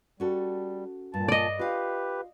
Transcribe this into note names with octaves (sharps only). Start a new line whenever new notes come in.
G3 C#4 F#4 A4
G2 A#2 A5
D5 D#5
F4 G4 B4 F5